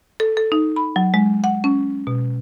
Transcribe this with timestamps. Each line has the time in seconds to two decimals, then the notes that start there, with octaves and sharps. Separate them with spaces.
0.20 A4
0.37 A4
0.52 D#4
0.76 B5
0.96 F#3
1.14 G#3
1.44 F#5
1.64 C#4
2.07 B2